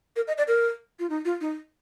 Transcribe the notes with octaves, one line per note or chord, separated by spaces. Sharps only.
A#4
D#5
D5
A#4
F4
D#4
F4
D#4